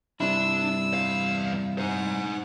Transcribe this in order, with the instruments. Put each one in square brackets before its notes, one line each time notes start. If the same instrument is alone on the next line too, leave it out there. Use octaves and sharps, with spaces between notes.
[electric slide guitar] G2 C3 E4 [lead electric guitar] D4 [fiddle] E6
[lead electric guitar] E2 F5
[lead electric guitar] D#4 C5 [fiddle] F#5